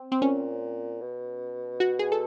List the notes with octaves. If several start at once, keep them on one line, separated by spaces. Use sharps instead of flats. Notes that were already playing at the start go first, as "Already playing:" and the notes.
Already playing: C4
C4
A#2 C#4
B2
F#4
G#4
A4